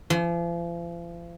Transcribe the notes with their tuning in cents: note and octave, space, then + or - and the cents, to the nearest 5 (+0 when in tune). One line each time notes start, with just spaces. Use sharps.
F3 -40